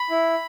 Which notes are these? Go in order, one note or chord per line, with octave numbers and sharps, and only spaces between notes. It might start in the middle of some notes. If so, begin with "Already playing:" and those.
Already playing: B5
E4